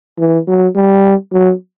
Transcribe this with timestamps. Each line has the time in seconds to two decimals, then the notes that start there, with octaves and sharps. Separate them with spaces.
0.18 E3
0.47 F#3
0.75 G3
1.32 F#3